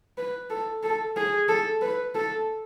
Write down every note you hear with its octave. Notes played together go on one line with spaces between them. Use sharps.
B4
A4
A4
G#4
A4
B4
A4